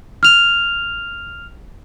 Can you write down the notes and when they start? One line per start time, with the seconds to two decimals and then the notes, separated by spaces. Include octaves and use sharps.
0.23 F6 F7